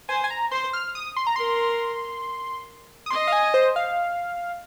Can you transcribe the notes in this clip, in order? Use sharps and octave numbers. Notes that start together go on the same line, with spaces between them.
C5 G#5
G#5
A#5
C5 C6
F6
D#6
C6
A#5
A#4 C6
D#6
D#5 C6
F5
G#5
C5
F5